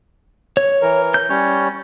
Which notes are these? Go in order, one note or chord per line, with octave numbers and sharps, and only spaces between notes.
C#5
E3 A#4
G6
G3 C#4 C#5